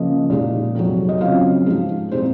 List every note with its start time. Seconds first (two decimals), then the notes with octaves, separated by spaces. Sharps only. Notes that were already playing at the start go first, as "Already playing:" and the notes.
Already playing: C#3 F3 A#3 D#5
0.30 A#2 G#3 D#4
0.75 F2 C3 F#3
1.09 D#5
1.21 C#3 F#3 C4 F4 F5
1.66 G#2 F3 G#3 D#4
2.12 A#2 G#3 C4 D#4 C5